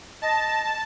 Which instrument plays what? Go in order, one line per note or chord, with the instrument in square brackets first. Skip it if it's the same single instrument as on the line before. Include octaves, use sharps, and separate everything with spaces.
[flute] D#5 [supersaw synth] A5